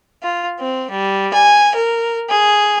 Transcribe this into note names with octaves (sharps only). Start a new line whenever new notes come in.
F4
C4
G3
G#5
A#4
G#4